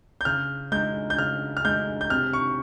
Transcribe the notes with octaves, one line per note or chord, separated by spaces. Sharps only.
G6
C#3 F6
G#3 G6
G6
C#3 F6
F6
G#3 G6
G6
C3 F6
C#6